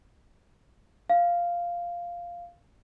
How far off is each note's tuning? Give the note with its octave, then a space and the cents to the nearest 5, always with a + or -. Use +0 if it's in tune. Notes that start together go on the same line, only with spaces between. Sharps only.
F5 -5